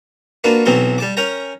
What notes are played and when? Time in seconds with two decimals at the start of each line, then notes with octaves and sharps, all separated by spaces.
0.44 A#3 D4 F4 F#4 B4
0.65 B1 E3 F#3 B3 C4 C6
0.98 G3 A5 D6
1.17 C#4 A#4 G5 A#5